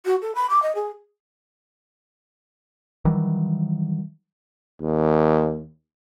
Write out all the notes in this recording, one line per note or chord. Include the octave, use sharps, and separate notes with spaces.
F#4
A4
B5
D6
D#5
G#4
D#3 E3 F#3 G3
D#2